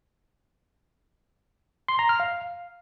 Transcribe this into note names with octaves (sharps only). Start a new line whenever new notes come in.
C6
A#5
F6
F5